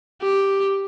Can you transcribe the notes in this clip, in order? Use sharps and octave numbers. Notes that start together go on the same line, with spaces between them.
G4